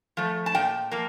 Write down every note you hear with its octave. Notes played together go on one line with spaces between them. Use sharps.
F3 A3
A5
A#2 G5
F3 A#3